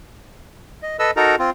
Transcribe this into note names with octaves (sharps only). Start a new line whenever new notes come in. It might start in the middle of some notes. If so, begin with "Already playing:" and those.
D#5
A4 B4 D#5 E6
D#4 F#4 A4 A#4 A#5
C4 F4